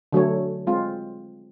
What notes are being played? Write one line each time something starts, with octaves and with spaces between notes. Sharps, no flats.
D3 F#3 A3 C#5
G#3 C4 F4